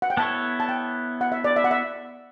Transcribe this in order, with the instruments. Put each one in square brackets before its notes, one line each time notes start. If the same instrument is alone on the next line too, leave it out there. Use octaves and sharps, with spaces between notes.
[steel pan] F#5
G5
[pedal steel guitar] B3 E4 A4 C#5 [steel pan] A5
[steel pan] A5
G5
F#5
E5
D5
E5
F#5
E5